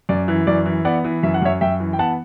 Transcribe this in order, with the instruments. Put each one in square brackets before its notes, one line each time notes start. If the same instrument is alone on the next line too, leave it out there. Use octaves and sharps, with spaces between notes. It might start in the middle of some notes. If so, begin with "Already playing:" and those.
[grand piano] F#2 D5
E3
F#2 D5
E3
B3 D5 F#5
E3
F#2 E5
F#5
F#2 C#5 E5
F#2 E5 G5
E3
G5
B3 F#5 A5